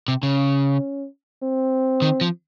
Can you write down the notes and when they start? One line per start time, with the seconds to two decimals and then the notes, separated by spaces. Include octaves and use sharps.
0.08 C3
0.23 C#3 C#4
1.43 C4
2.02 D#3
2.21 F3